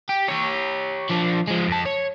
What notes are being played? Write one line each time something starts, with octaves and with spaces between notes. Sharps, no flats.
G4
G4 C#5
F3 D4
F3 G#3
F2 A5
C#5